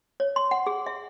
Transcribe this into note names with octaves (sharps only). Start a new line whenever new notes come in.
C#5
C6
F#5
G#4
E5